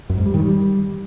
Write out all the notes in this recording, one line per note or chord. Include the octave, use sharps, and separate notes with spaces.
F#2
G#2
G3
D#3
G3